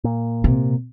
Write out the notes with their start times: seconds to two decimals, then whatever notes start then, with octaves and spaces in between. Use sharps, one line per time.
0.04 A#2
0.44 C3